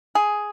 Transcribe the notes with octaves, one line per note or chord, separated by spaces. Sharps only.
G#4